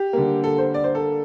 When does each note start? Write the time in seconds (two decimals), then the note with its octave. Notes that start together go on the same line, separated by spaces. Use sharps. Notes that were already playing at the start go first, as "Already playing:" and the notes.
Already playing: G4
0.13 D3 G3 A#3
0.44 A4
0.58 C5
0.74 D5
0.84 C5
0.95 A4